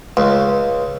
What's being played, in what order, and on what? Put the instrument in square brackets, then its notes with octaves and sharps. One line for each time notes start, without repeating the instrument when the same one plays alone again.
[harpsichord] C#2